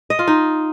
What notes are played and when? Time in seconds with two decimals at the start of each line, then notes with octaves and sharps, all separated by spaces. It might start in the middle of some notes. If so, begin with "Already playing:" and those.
0.10 D#5
0.19 F4
0.27 D#4